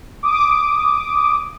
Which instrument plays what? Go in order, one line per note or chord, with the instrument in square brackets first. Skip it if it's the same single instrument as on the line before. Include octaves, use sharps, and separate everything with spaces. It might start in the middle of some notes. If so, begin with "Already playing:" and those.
[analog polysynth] D6 D#6